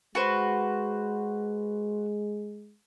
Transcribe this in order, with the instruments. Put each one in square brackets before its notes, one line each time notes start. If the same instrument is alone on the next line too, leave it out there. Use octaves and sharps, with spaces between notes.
[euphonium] G#3 [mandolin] F#4 B4 C5